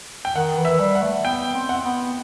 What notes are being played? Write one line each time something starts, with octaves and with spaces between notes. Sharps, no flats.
G5
D#3 F#5
E3
E5
G3
F#5
A3
B3 G5
C4
F#5
B3